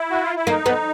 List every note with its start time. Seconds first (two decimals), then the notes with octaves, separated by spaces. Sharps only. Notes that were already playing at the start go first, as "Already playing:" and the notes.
Already playing: E4
0.10 F#4
0.23 F4
0.36 E4
0.47 A#3 D#4
0.66 B3